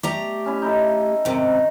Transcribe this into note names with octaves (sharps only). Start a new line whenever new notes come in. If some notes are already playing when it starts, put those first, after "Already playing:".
A3 G4 D5 A#5
C#4 E4
D#4 E4 A4
G#2 C3 D#3